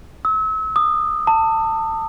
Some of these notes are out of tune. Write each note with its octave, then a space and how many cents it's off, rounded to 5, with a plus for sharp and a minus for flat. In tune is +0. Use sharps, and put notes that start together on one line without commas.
E6 -35
D#6 -30
A5 +25